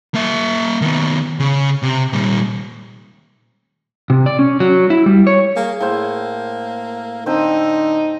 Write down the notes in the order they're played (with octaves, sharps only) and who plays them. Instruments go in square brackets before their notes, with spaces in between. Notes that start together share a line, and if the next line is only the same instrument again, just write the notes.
[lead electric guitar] A#3 E5
D#3 B3
C#3
C3
A#2 G3
[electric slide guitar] C3
D5
C#4
F#3
E4
G3
C#5
[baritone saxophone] A#3 [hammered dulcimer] G#4
[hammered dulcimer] A2 C5 [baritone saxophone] A#3
[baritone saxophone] D3 [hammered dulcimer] C4 C5 [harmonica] D#4